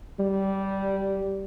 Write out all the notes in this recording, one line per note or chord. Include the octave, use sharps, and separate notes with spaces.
G3